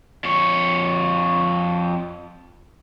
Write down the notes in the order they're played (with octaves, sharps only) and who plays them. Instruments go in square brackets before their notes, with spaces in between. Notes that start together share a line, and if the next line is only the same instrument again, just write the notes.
[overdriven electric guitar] F2 C#5